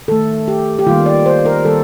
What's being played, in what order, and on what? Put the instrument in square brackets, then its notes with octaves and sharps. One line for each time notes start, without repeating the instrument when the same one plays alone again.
[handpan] D#3 A3 A4
G4
G4
D#3 G3 A#3 F4
D5
C5
A#4
D#3 G3 A#3 A4